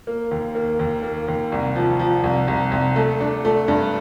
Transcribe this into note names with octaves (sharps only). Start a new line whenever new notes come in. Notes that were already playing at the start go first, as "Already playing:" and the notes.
A#3
D#2
A#3
D#2
A#3
D#2
C2
F3
F3
C2
C2
C2
A3
D4
A3
G2